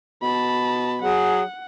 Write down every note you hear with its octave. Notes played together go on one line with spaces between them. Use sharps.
B2 A5 B5
F#3 G#4 F#5